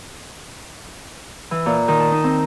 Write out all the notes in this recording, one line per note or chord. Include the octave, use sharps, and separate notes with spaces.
E3
A#2
D#3
A5
D#4
C4